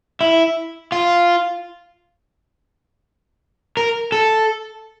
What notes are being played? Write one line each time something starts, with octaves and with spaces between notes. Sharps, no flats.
E4
F4
A#4
A4